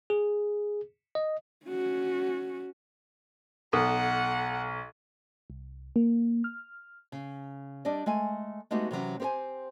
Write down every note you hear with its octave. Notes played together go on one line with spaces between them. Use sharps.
G#4
D#5
C#4 F#4
B1 A4 F#5
C2
A#3
F6
C#3
G3 D4 D5 D#5
G#3 A3 G#5
G#3 A3 B3 D#4 F#4 G4
C3 E3 F#3 C#4
C4 G4 A#4 C5 G#5